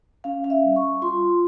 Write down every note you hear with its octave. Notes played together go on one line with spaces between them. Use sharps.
C#4 F5
F5
E5
G3
C#6
F4 C6